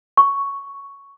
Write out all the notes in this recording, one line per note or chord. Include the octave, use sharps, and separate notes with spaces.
C#6